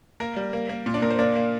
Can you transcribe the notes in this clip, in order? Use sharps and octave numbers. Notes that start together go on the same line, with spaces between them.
A#3 A#4
G3
A#3
A#3
A#2
D4 D5
A#2 A#4
C5
A#3 D4 D5
A#3